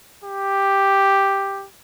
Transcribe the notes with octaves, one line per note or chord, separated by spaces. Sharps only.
G4